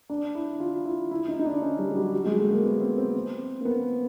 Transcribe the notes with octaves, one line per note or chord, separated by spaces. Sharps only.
D4
E4
F4
E4
E4
D#4
D#4
D4
C#4
G3
G3
F#3
F#3
G#3
A3
A#3
B3
C4
C4
A#3
B3